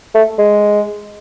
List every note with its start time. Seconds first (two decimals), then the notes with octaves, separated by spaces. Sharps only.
0.15 A3
0.38 G#3